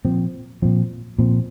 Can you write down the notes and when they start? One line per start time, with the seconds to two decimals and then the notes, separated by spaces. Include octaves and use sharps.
0.05 A#2 F3 C4
0.62 A#2 F3 C4
1.19 A#2 F3 C4